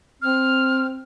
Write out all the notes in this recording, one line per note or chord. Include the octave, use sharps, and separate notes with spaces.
C4 F6